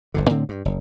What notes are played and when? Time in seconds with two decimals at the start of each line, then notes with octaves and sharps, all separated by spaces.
0.14 G1 F2 D3
0.30 A2 D3 C4
0.49 G2
0.65 F#1